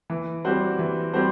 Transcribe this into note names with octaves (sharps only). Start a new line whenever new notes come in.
E3
G3 C4 F#4 C5
E3
G3 C4 F#4 C5